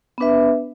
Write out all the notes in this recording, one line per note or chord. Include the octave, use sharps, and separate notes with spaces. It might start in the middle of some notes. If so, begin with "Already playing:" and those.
B3 D4 B4 E5